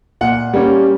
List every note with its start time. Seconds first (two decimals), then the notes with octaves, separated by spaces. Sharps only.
0.21 A#2 F#5
0.54 G3 A#3 C#4